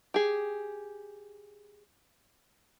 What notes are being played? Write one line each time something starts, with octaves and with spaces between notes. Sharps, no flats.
G4 G#4